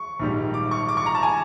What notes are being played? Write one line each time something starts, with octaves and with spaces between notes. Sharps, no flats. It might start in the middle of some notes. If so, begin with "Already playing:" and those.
Already playing: C#6
A#1 G#2 D#3 G3
D6
C#6
D6
C#6
A#5
A5
G#5